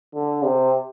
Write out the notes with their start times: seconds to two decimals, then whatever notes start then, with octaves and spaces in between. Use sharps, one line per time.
0.15 D3
0.43 C3